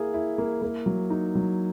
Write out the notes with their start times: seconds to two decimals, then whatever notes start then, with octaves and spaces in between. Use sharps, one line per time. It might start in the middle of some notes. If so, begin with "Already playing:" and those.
Already playing: A#3 E4 G#4
0.14 E4
0.38 A#3
0.62 A#3
0.86 F#3
1.10 D#4
1.35 F#3